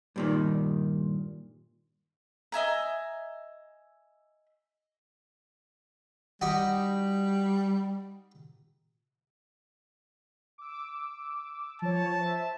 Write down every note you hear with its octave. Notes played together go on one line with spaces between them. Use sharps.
G2 A#2 D#3
D#5 E5 G#5 A#5
G3 D#4 F#4 G4
D6 E6
F3 C#5 A5
C5 E5